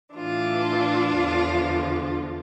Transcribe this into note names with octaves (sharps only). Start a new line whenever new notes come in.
A2 E3 D4 F4
E2 D3 F3